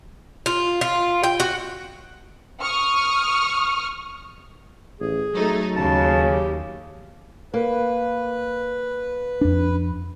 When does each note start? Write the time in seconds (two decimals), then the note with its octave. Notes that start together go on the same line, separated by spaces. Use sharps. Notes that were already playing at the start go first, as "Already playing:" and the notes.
0.46 F4
0.81 F4
1.24 G5
1.40 F#4
2.61 C#6 D#6 F6
5.00 A1 G#4
5.35 F#3 A3 D#4
5.76 D#2 C#3 A5
6.31 G4
7.54 A#3 B4
9.41 F2 D4